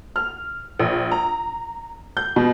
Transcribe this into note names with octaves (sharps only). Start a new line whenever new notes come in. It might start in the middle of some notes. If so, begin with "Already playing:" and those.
F6
A#1
A#5
G6
B2